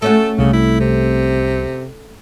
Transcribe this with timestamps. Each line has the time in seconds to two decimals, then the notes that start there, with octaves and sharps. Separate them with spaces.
0.02 A3 C#4 F#4 A4
0.38 C2 C#3
0.53 E4
0.80 C3